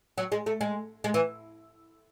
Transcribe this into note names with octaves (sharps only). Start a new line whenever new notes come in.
F#3
G#3
A3
G#3
G#3
E3